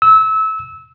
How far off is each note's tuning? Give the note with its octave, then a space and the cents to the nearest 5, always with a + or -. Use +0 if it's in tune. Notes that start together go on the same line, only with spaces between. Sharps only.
E6 -25